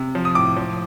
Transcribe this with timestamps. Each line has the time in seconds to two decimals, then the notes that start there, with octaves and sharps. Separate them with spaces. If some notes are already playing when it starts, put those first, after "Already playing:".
Already playing: C3
0.15 F3
0.25 D#6
0.35 A2 D6
0.56 F3